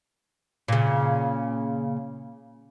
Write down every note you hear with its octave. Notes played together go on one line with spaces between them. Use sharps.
A#2 C#3